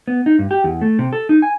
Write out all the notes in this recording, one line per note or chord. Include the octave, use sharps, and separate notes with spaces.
B3
D#4
G2
G4
E2
A3
C3
A4
D#4
G#5